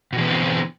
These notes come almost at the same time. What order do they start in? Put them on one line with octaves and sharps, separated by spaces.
B2 E3 B3 D3 C4